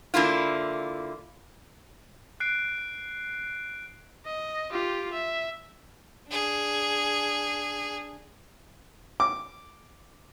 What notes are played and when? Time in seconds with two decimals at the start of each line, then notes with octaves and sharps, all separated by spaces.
0.14 D3 A#3 E4 F4
2.40 F#6 C7 D7
4.26 D#5
4.71 F4 G4
5.13 E5
6.29 D4 G#4
9.20 D6